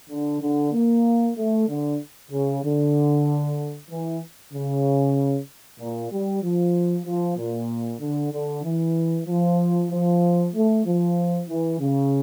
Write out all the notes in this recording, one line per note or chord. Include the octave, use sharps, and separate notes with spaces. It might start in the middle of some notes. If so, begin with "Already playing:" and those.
D3
D3
A#3
A3
D3
C#3
D3
E3
C#3
A#2
G3
F3
F3
A#2
D3
D3
E3
F3
F3
A3
F3
E3
C#3